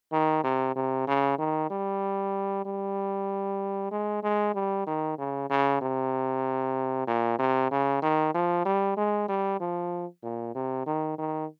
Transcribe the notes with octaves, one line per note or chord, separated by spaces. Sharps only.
D#3
C3
C3
C#3
D#3
G3
G3
G#3
G#3
G3
D#3
C#3
C#3
C3
A#2
C3
C#3
D#3
F3
G3
G#3
G3
F3
A#2
C3
D#3
D#3